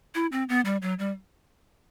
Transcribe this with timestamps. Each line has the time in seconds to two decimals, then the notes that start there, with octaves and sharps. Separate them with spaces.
0.15 E4
0.32 C4
0.49 B3
0.65 G3
0.82 F#3
0.99 G3